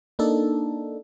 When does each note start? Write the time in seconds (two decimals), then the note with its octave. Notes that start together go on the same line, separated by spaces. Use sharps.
0.19 A#3 D4 D#4 A4